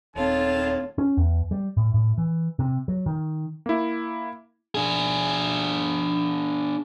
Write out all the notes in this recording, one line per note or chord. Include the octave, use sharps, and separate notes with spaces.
D#1 D#3 C4 F4 A4 C#5 A5
C#4
E2
G3
A2
A2
E3
C3
F#3
D#3
A#3 E4
D4 G#4